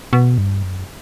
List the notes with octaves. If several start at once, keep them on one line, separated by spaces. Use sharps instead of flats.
B2
G2
F#2